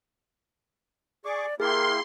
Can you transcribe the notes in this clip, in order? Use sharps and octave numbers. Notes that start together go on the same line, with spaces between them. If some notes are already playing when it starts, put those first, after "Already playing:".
G#4 D5 C#6 D6
A#3 E4 G4 G#4 A#4 C6